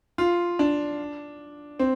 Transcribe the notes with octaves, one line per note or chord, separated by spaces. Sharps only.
F4
D4
C4